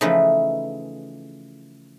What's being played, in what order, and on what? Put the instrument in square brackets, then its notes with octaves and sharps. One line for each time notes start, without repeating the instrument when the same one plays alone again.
[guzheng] C#3 E3 F3 A3 D#4 B4